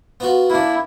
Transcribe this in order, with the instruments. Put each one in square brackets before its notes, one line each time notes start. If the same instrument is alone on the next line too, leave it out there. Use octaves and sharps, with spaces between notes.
[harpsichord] B3 F4 F#4
[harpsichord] A#3 D4 [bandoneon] E4